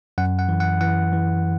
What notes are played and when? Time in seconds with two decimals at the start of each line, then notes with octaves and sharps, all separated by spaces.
0.18 F#2 F#5
0.39 F#5
0.49 E3
0.60 F#5
0.81 E3 F#5
1.13 E3